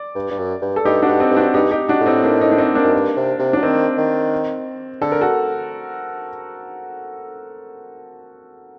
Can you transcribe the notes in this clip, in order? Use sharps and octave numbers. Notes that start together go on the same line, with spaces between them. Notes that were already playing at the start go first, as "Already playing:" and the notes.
Already playing: D5
G2
G2
F#2
G2
A4
G2 D#4 G4
D4 F#4
G2
C4 D#4
G2
D4 F#4
G2 D#4 G4
D#4 G4
D4 F#4
A2
C4 D#4
A#3 D4
C4 D#4
D4
C4 D#4
A#3 D4
F#2
G2
C3
C3
F#3 D4
D#3 C4
D#3
D3 A4
A#4
F#4 A4